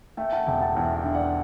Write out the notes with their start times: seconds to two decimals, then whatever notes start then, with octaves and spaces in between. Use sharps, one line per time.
0.17 A3 E5 G5
0.32 F#5 A5
0.47 E1 E5 G5
0.61 F#5 A5
0.75 E2 E5 G5
0.95 E5 G5
1.04 D3
1.14 D5 F#5